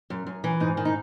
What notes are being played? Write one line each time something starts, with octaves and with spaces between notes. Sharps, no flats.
F#2
F#2
E3
G#2 D#4
D#3
D#4